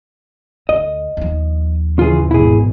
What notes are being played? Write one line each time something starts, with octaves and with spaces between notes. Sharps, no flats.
D2 D#5
D#2 F3
C#3 E3 F4 G#4
G#1 B2 E4 G#4